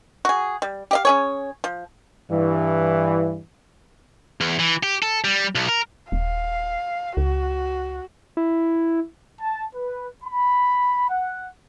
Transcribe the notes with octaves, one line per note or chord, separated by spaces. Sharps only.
F#4 G#4
G3
G4 D#5 F5
C#4 G#4 C#5
F3
G2 E3
E2
E3
G4
A4
G3
B1
A#4
D#1 F5
C#2 F#4
E4
A5
B4
B5
F#5